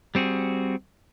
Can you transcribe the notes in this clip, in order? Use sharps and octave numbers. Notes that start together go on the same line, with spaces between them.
G3 C4 F#4 G#4